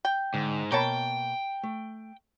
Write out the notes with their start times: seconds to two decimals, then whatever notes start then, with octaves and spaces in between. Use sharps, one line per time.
0.05 G5
0.34 G#2 D3
0.72 B2 A#3 A#4 C#5 G5 A5 B5
1.63 A3